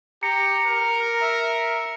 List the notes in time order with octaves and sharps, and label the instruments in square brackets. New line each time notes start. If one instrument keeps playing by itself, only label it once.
[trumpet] G4 [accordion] A#5 [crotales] C#7
[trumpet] A#4
[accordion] E5